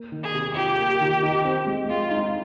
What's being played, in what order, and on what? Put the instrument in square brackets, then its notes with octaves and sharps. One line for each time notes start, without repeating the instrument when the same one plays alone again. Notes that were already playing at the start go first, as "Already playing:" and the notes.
Already playing: [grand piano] A#3
D#3
[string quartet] G#4
[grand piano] C3
[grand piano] F4 [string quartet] G4
[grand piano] A#3
D#3
D#4
C4
G#3
[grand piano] G#3 [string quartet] F4
[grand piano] D#4